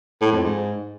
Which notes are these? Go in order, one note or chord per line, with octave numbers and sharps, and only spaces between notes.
A2
F2
G#2